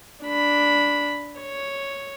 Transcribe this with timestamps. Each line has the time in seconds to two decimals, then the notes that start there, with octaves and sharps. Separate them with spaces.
0.25 D4 B5
1.40 C#5